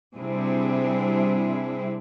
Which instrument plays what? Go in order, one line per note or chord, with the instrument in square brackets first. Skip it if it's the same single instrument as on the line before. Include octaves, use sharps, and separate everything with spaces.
[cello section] C3 G3 C4 D4 E4 G#4